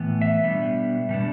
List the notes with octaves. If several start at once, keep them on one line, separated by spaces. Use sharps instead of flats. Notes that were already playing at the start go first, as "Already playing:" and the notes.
Already playing: A2 E3 B3
E5
B2 G3 B3 D4
B2 G3 B3 D4